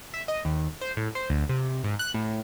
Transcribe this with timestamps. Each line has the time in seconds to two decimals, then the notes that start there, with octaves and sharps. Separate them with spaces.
0.14 E5
0.28 D#5
0.45 D#2
0.81 C5
0.97 A2
1.15 C5
1.30 D2
1.49 C3
1.84 G#2
1.99 F#6
2.14 A2